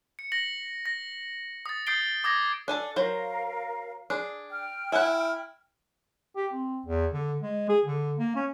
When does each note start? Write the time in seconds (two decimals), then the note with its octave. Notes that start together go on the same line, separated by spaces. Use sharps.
0.19 C#7
0.32 A#6 F#7
0.86 A#6
1.66 D#6 A6
1.87 D#6 G6 A6 C7 D7 G7
2.24 D6 D#6 G#6 A#6
2.68 D4 A4 G#5 A5
2.96 F#3 A#4 C5 F5
4.10 D4 G#4
4.51 G5 F6
4.92 E4 F#5 G#5
6.36 G4
6.53 C4
6.86 E2
7.13 D3
7.42 G#3
7.69 G#4
7.85 D3
8.19 A#3
8.35 C#4